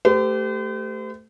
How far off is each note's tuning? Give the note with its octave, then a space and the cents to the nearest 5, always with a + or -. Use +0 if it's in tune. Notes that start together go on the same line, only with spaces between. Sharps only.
A3 +0 G4 -10 C5 -45